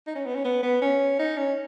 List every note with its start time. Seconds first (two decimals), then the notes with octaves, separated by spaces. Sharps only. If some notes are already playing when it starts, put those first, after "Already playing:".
0.07 D#4
0.16 C#4
0.26 B3
0.35 C#4
0.45 B3
0.63 B3
0.82 C#4
1.19 D#4
1.38 C#4